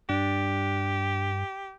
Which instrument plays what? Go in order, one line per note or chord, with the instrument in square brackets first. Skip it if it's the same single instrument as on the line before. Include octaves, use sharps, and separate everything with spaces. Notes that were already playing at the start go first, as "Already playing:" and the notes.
[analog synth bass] G2 [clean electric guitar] D4 [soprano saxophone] G4